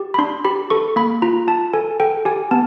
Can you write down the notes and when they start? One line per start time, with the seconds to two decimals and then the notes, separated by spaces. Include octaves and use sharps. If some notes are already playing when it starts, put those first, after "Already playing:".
Already playing: G4
0.14 B5
0.18 D4 C6
0.44 G4 B5
0.70 A4 C#6
0.96 A#3 B5
1.22 F4 A#5
1.47 F4 A5
1.73 A4 G#5
2.00 A4 G5
2.25 G4 G#5
2.51 B3 A5